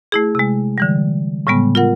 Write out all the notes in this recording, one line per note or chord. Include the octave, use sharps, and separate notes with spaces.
A3 E4 G#4
C3 G#3
D3 E3 G3
A2 C#3 G3 G#3 B3
F4 A#4 F#5